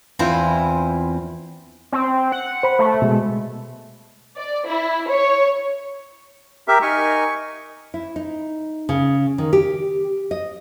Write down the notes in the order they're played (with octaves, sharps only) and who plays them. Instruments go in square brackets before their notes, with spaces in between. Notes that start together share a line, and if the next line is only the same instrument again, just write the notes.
[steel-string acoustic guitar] E2 C4 E4 F4 C5 G#5
[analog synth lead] C4
F#5
[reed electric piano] C5 B5
[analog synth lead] A3
[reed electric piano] B2 G#3
[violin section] D5
E4
C#5
[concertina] G4 A#4 E5
[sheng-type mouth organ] D#4 A#4 G#5 [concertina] C#6
[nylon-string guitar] E4
D#4
C#3
D#3
G4
D#5